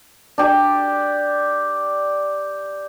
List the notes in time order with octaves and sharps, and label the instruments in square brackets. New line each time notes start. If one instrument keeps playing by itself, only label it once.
[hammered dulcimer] D4 G4